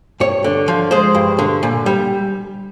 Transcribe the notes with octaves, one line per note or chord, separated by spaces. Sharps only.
G2 C#5
D3
F3
G#3 C5
G2
D3
A#2
G3